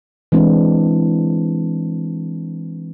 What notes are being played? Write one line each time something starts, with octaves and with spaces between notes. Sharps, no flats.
E3 G#3 C4 D4 E4